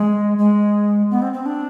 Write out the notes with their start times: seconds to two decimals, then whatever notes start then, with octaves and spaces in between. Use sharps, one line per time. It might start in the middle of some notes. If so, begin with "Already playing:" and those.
Already playing: G#3
0.38 G#3
1.10 B3
1.22 C4
1.33 C4
1.46 D4